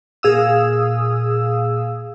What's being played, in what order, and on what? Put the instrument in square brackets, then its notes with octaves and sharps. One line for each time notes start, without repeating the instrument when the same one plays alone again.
[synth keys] A#2 G#4 F5 D#6 E6